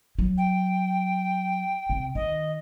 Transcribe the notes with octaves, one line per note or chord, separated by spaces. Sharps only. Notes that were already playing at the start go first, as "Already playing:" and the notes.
F#3
G5
C3
D#3 D#5